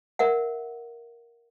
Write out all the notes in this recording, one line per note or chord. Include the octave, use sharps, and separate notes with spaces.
A#4 E5 F#5